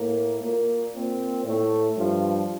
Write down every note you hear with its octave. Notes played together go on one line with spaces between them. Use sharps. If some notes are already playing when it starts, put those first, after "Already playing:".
Already playing: A2 A#3
A#2 A#3
A#2 C4
A2 A3
G2 F3